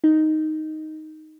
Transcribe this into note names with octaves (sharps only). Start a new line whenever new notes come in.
D#4